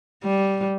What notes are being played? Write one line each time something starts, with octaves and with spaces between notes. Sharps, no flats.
G3